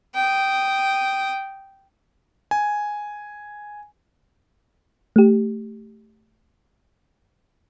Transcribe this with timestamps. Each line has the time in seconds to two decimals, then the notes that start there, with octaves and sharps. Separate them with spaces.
0.15 G5 D#6
2.51 G#5
5.16 A3 G4